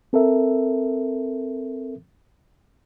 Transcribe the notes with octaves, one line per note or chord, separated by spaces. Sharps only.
C4 A4 A#4 E5